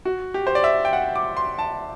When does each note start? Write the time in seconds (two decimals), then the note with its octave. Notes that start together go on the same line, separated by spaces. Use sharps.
0.05 F#4
0.34 G4
0.47 C5
0.55 D5
0.64 E5
0.85 G5
0.93 F#5
1.16 D6
1.37 C6
1.59 A5